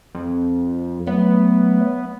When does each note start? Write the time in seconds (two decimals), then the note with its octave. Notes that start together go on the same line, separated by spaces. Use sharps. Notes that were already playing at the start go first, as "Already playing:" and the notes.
0.15 F2
1.07 F#3 A3 B3